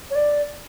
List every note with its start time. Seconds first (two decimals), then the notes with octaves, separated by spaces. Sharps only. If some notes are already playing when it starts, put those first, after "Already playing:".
0.10 C#5
0.15 D5